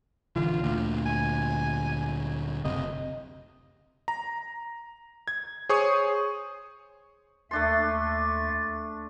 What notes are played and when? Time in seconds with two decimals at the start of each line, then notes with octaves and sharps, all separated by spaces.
0.36 A#1 D3 E3 F4
0.64 D2 A#2
1.06 G#5
2.65 F#1 C3 D#5
4.08 A#5
5.28 G#6
5.69 G#4 C5 C#5 C#6 D#6
7.51 D#2 A3 D4 E5 C6 A6